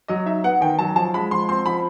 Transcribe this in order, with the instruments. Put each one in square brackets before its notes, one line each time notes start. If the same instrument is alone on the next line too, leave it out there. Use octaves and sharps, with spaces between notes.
[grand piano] F#3 [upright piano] D#5
[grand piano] D#4 [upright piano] E5
[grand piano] B3 [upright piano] F#5
[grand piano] D#3 [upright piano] G5
[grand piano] F#3 [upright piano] A5
[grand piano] F3 [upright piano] A5
[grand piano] G#3 [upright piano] B5
[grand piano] F3 [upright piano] C6
[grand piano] C4 [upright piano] C6
[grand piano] F3 [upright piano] B5